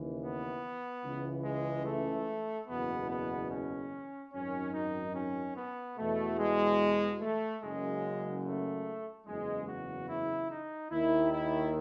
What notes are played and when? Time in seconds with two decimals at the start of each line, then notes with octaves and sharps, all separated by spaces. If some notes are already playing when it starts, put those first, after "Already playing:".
Already playing: D#2 C#3 E3
0.21 B3
1.03 C#2 C#3 E3
1.45 G#3
1.86 A3
2.68 F#1 E2 B2 B3
3.10 B3
3.51 C#4
4.33 G#1 F#2 D#3 C#4
4.74 D#4
5.15 C#4
5.56 B3
5.97 E2 B2 A3
6.39 G#3
7.21 A3
7.62 F#1 F#2 C#3 G#3
8.45 A3
9.27 F#1 E2 C#3 G#3
9.68 F#4
10.09 E4
10.51 D#4
10.92 D#2 D#3 E4
11.32 E4